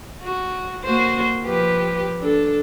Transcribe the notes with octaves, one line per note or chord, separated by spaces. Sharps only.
F#4
A#3 F#4 C5
F3 G4 B4
D4 A4